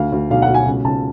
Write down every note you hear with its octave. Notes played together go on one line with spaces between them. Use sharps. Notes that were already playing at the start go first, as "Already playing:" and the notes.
Already playing: D2 F5
D2
B1 F5
F#5
B1
G#5
C#2
C#2 A5